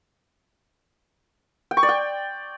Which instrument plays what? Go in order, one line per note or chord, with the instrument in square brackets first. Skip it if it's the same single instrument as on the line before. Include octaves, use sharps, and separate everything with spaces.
[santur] G5
C#6
D5
G5